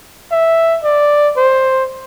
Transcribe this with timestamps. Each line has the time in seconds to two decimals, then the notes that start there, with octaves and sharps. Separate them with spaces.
0.31 E5
0.84 D5
1.37 C5